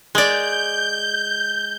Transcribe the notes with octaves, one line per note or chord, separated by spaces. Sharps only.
G#3 D5 G6